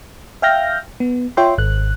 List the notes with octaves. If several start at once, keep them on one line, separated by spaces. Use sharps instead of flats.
E5 F5 G5 F6 G6 A#6
B3
F4 C#5 E5 G5 C6
G#1 F#6